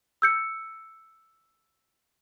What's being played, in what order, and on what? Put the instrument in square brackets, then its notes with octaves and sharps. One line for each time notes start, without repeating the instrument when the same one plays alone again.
[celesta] E6 G6 C#7